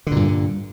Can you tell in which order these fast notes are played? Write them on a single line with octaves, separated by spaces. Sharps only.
D3 A#2 G2